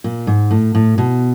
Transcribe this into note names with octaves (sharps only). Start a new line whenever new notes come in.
A#2
G#2
A2
A2
B2